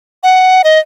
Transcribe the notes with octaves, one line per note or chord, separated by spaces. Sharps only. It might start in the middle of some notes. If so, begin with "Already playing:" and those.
F#5
D#5